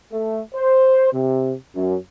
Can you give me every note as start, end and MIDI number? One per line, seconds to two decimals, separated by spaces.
0.12 0.41 57
0.54 1.13 72
1.13 1.54 48
1.75 1.96 42